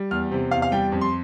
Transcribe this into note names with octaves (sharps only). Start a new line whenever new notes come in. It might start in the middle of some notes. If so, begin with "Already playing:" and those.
Already playing: G3
E2 F6
C3
E2 F5
F5
G3 G5
F2
C6